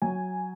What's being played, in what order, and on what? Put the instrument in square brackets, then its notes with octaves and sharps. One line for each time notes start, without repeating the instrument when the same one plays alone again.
[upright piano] F#3 G#5